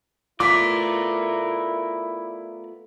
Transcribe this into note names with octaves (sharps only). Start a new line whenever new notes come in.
A3 B3 E4 F4 A#4 D5 D6 B6